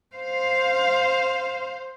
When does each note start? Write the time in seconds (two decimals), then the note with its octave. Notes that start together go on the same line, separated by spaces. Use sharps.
0.16 C5 F5